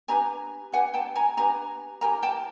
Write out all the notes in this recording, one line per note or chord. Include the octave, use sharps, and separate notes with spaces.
D4 G4 B4 G#5 A#5
D4 G4 B4 F#5 G#5
G5 A5
G#5 A#5
D4 G4 B4 G#5 A#5
E4 G4 A#4 G#5 A#5
G5 A5